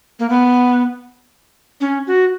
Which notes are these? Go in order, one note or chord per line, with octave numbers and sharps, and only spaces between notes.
A#3
B3
C#4
F#4